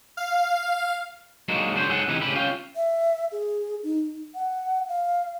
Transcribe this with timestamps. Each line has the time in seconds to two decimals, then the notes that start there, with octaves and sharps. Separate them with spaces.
0.17 F5
1.48 F#3 G#3 A#3 D4 D#4 F#4
1.75 C#3 D4 F#4 C5
1.89 G#2 F#3 G#4 A4 C5 F#5
2.08 C3 E3 B3 D#4 E4
2.21 A2 C#3 G3 G4 B4 B5
2.35 C#4 F4 F5 G5
2.76 E5
3.32 G#4
3.83 D#4
4.35 F#5
4.89 F5